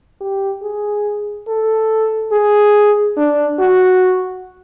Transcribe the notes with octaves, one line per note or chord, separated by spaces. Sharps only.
G4
G#4
A4
G#4
D4
F#4